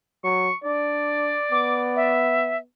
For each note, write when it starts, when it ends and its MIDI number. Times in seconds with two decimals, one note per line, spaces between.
0.24 0.49 54
0.24 0.54 85
0.64 1.37 62
0.64 2.16 74
1.51 2.65 59
1.51 1.80 86
1.96 2.57 76